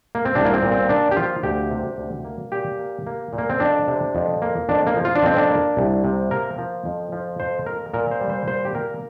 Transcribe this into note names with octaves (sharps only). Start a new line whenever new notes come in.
A#3
C4
C2 D4
A#3
C4
A#2
C4
A#3 D4
G4
F3 F4
D2 G4
C3
D2
A#3
A#2 G4
A#3
A#3
A#2
A#3
C4
F2 D4
C3
F2
A#3
F2 D4
A#3
F3
F4
D4
F2 C4
D4
A#3
C2
C3
A#3 A#4
F3
F2
F3
F2 C5
A#3 A#4
A#2 A#4
C5
G3
C5
A#2 C5
G4
A#3 A#4